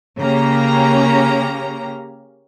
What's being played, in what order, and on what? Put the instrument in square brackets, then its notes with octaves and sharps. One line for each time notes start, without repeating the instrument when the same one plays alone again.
[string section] C#3 A#3 C#4 G4 A#5